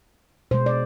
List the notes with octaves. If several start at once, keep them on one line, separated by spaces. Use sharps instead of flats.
B2 G#3 C5
D5